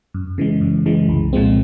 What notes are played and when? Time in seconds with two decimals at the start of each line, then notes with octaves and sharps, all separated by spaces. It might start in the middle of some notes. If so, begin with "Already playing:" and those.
0.14 F#2
0.38 C#3 E3 G#3
0.61 F#2
0.86 C#3 E3 G#3
1.09 C2
1.33 A#2 F3 G#3 C4